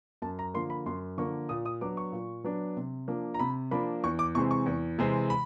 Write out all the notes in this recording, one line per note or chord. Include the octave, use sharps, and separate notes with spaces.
F#2 A5
A#5
D3 F3 A#3 C6
B5
F#2 C6
D3 F3 A#3 C#6
A#2 D#6
D#6
F#3 B3 D4 D6
C#6
A#2
F#3 B3 D4
C3
F3 A#3 D4
A#5
C3 B5
F3 A#3 D4 B5
E2 C#6
D6
C3 E3 G#3 C4 C#6
C#6
E2
C3 E3 G#3 C4
B5